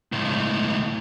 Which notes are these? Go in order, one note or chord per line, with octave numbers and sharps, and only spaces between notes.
C#2 A2